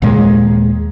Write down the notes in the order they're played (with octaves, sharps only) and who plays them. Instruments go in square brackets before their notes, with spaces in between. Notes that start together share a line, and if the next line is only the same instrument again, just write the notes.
[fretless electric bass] D#2 A#2 G#3